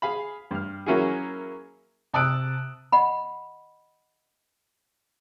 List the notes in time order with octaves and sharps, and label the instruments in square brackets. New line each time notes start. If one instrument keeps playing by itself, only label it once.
[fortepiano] G#4 F5 B5
G2 F6
F#3 A#3 C#4 E4 F#4 G#4
[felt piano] C3 A5 D#6 E6 F#6 D7
[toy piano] D#5 F#5 B5